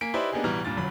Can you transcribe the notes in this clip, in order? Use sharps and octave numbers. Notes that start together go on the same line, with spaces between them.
A#3 G#5 B6 D7
D#4 E4 G4 B4 C5 D5
A#3 B3 D4 D#4 G4 G#4
A1 B2 E3 G3 A#5 F6
G2 A#2 A6
G1 F#2 F#3 B5